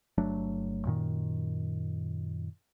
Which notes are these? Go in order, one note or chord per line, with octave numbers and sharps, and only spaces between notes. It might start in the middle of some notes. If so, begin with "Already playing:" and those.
G1 F#3 A3 D4
F#2 A#2 D#3